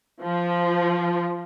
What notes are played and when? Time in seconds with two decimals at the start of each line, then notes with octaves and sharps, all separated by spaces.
0.23 F3